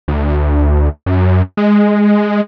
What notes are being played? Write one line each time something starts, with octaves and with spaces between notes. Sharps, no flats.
D2
F#2
G#3